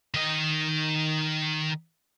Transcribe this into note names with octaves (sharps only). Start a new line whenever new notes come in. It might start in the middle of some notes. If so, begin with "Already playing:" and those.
D#3 D#5